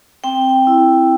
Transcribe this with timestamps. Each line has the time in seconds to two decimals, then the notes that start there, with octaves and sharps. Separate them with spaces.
0.24 C4 G5
0.67 E4